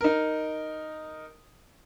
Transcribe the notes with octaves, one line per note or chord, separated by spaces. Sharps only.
D#4 A#4